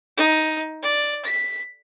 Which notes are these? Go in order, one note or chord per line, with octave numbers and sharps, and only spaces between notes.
D#4
D5
B6